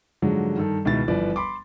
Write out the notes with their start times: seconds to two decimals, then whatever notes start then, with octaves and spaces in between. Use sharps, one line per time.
0.22 G#2 D3 F3 F#3 G#3
0.56 G2 D#3 A4
0.85 C#2 B2 D#3 B3 E4 A6
1.08 G1 E3 F3 B4 D5
1.36 B5 C6 D6